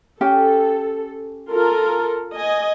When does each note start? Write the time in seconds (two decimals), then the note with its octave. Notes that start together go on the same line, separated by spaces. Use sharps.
0.21 C#4 G4 A4 G5
1.51 F4 A4 A#4
2.35 D#5 G#5